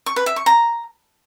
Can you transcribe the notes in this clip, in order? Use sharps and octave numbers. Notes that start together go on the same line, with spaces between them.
C#6
B4
E5
C#6
A#5